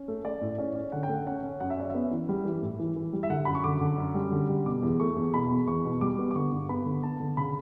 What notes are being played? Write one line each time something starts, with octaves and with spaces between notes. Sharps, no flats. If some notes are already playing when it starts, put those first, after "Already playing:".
Already playing: C#4
A3
A3 D5
A2
C#4 D5
C#4
D3 F#5
G5
A3
F#5
C#4 F#5
C#4
F#2 F#5
E5
C#4 D5
B3 E5
E3
G3
E3
A2
E3
E3
G3
E5
D3 F#5
F#2 B5
C#6
D3 D6
D3
F#2
G3
D3
G3
B2 D6
E2
A3 C#6
E2
B2 B5
E2
E2 C#6
B2
G3 D6
B3
D6
D3 C#6
G2
B3 B5
D3
B3 A5
D3
C#3 B5